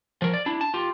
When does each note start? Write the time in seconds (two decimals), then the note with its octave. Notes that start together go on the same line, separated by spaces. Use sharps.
0.22 F3 A#4
0.34 D5
0.46 D4 E4
0.61 A5
0.74 F4 G4